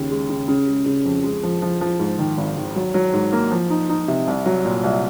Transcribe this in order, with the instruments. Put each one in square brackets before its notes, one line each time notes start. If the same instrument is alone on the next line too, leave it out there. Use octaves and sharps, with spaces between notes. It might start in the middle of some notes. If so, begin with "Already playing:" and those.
Already playing: [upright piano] D#2 C#3
G#3
C#3
C#3
G#3
C#3
F2
G#3
F3
F3
F3
G#2
D#3
G#1
D#3
F#3
F#3
G#2
A#3
F3
D#4
D#4
C3
C2
F#3
A#2
C2